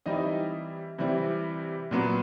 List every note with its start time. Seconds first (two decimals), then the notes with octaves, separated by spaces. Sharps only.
0.06 E3 G3 C4 D#4 E4 D#5
0.98 C3 E3 G3 C4 E4
1.91 A#2 F#3 B3